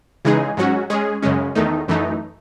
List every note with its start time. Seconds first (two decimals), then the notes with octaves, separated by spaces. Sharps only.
0.25 C#3 E3 G#3 D#4 G#4
0.57 G#2 F#3 C#4 F#4
0.90 G#3 C#4 G#4
1.22 F#2 C#3 G#3 C#4
1.55 E2 D#3 A3 D#4
1.88 F#2 E3 A3 D#4